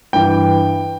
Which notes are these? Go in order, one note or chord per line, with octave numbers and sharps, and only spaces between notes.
G2 E3 G5